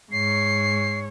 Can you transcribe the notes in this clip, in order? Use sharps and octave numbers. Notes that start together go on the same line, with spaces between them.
G#2 C#5 C7